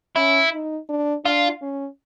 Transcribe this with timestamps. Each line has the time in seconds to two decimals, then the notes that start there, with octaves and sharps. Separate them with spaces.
0.16 C#4 E4
0.53 D#4
0.89 D4
1.25 D4 F4
1.62 C#4